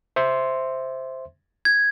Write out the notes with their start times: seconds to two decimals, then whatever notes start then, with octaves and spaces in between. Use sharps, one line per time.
0.16 C5 E5 C6
1.65 G#6